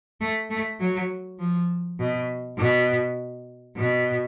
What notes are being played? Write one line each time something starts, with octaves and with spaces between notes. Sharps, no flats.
A3
A3
F#3
F3
B2
B2
B2